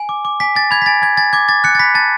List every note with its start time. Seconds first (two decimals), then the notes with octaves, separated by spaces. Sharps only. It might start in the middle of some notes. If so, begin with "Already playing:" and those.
Already playing: G#5
0.09 D6
0.25 D6
0.40 G#5 B6
0.55 G#5 A6
0.71 B5 G#6
0.82 B6
0.86 G#5 A6
1.02 G#5 G#6
1.17 G#5 A6
1.33 D6 G#6
1.48 D6 A6
1.64 F#6 C#7
1.75 A6
1.79 B5 B6
1.94 A5 A6